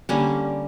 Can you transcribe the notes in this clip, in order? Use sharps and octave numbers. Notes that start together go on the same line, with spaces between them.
D3 G3 A#3 C#4